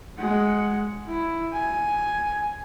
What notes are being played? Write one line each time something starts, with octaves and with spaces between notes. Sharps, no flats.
G#3 F#5
E4
G#5